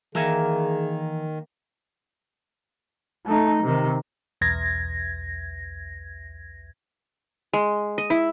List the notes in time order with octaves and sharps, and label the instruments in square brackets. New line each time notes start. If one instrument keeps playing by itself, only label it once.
[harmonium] D#3 [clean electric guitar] E3 E5 G#5 [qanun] A#3 [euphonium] G#4
[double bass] A3 D#4
C3 D#3
[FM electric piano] B1 E2 G#6 A#6
[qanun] G#3
D#5
E4